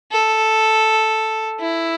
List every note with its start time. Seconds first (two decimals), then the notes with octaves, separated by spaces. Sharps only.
0.12 A4
1.59 E4